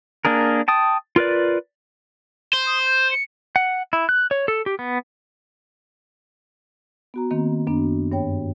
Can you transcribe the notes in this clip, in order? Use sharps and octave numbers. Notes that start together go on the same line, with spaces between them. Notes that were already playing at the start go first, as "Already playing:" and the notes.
A#3 D4 G#4 A#4
G5 A5 D#6
F4 A#4 B4 D5
C5
D#6
G6
C#7
F#5
E4
F#6
C#5
A4
G4
B3
B3 F#4 A#5
D#3 A#3 C4
F#2 B3 D4
G2 C#5 G5